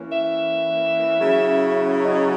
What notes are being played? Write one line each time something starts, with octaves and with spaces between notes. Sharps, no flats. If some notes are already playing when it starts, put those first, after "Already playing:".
Already playing: E3 A#3 C#4
E5
C#3 F#3 C#4 E4
D#5